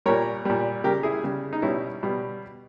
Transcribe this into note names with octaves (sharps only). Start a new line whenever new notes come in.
A#2 G3 A#4 C#5
A#2 G3
C#3 G3 G4 A#4
E4 G#4
C#3 G3
D#4
B2 G3 C#4 E4
B2 G3